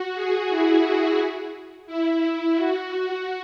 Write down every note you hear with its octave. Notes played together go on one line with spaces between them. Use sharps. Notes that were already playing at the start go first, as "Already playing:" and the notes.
Already playing: F#4
G#4
E4
E4
F#4